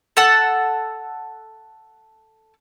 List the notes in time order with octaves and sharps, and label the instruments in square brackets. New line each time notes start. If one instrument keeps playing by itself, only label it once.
[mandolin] A4 F#5 A5